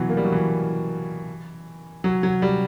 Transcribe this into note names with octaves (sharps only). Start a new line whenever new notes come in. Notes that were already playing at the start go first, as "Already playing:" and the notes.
Already playing: B2 E3 F#3
A#3
G3
F#3
E3
F#3
F#3
G3